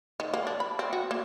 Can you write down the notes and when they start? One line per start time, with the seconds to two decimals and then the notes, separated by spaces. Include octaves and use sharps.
0.20 D#3
0.34 A#3
0.47 D4
0.60 B5
0.79 C4
0.93 F#4
1.11 A#3